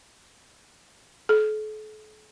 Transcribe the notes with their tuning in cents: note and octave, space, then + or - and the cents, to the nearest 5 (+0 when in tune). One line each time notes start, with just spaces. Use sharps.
A4 -40